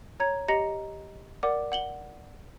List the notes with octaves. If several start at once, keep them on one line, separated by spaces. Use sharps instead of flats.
C#5 A#5 G#6
G4 D#5 A#5 A#6 C#7
A#4 D5 F#5 D6
F#5 F#7 G7